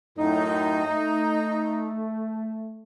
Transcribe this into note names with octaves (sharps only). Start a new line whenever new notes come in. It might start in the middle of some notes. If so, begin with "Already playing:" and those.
F#2 A2 D#4
A3